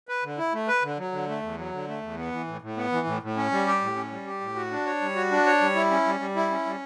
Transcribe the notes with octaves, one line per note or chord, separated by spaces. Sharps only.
B4
D3
E4
A3
B4
D3
F#3
D3
A3
E2
F#3
D3
A3
E2
B3
E3
A2
A2
B3
E3
A2
A2
C#4
G3
G4
A2
C#4
G3
G4
A2
F#4
D4
C#5
G3
F#4
D4
C#5
G3
E4
C#4
G3
G3
E4
C#4
G3